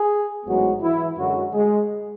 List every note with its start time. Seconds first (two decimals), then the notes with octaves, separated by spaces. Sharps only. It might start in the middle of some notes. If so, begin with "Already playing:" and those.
Already playing: G#4
0.45 A1 G#2 F#3 G#3 B3 F#4
0.82 E3 E4
1.17 F#2 D3 F#3 G#3 F#4
1.53 G#3 G#4